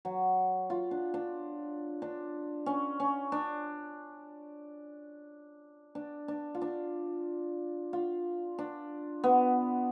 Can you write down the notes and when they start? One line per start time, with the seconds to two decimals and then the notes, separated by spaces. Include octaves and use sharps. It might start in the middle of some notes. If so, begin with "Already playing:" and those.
0.05 F#3
0.70 F4
0.91 D4
1.14 D4
2.02 D4
2.66 C#4
3.00 C#4
3.32 D4
5.95 D4
6.28 D4
6.55 F4
6.61 D4
7.93 F4
8.59 D4
9.24 B3